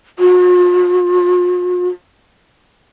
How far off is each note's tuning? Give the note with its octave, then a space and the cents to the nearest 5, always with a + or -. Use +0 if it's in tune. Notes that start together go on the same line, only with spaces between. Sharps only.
F4 +45